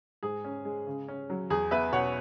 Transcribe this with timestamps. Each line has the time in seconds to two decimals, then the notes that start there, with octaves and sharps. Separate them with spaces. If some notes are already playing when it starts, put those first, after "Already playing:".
0.23 G#2 G#4
0.44 C#4
0.65 G#3
0.87 C#3
1.08 C#4
1.30 F#3
1.50 E2 G#4
1.71 B3 B4 E5
1.92 B2 C#5 F#5